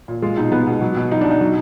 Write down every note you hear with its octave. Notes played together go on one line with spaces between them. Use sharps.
A#2
G#3 F4
B2 D#4
G#3 B3
B2
F#3
B2
F#3 D#4
D4
B2
D#4
F#3